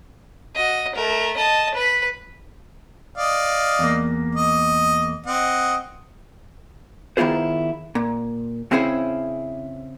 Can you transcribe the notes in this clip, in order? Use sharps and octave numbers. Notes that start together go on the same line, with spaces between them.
F#4 D#5
A3 A#4
D#5 A5
B4 B5
D5 D#5 F5
E2 A#3
D#5
C4 D#5 F#5
D#3 B3 E4 F4 G#4 C5
A#2
C#3 C4 C#4 E4 G#4 C5